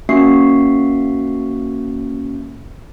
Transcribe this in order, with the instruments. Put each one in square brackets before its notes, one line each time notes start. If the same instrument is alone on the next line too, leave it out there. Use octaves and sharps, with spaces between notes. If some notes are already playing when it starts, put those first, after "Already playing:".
[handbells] A#3 C#4 F#4 E5 C#6 C7